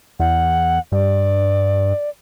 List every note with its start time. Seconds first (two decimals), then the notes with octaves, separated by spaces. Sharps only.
0.20 E2 F#5
0.92 G2 D5